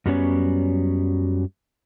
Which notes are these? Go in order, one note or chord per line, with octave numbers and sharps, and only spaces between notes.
F#2 F#3 G3 B3 C#4 C#5